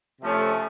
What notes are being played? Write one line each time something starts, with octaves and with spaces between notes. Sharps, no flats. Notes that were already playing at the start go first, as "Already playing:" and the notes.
C3 F3 A3 C#4